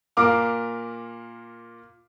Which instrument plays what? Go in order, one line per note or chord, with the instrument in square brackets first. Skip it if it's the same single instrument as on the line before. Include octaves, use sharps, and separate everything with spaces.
[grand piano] A#2 A#4 F5 A#5 D6 F6